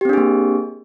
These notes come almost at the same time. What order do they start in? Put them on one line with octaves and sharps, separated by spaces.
G4 C4 D4 G#4 A#3